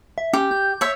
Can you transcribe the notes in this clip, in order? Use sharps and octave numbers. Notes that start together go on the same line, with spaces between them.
E5
C#4 G4
G6
C#5 E5